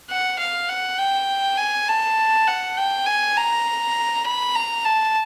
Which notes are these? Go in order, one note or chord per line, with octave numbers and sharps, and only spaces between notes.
F#5
F5
F#5
G5
G#5
A5
F#5
G5
G#5
A#5
B5
A#5
A5